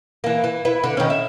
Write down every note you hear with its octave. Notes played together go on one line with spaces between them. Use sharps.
E3 A#3
E3
E4 B4
D3
D#3 C#4
E5